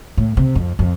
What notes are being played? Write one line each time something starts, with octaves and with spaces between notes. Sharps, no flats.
A2
C3
F2
F2